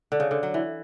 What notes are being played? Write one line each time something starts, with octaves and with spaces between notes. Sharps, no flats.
D3
C#3
D3
F#3
E3